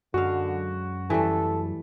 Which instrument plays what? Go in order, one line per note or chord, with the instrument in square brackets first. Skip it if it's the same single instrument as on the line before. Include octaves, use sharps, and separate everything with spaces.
[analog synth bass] F#2 [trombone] D3 [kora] G#3 F5 [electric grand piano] F#4
[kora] E3 G3 A3 [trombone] A4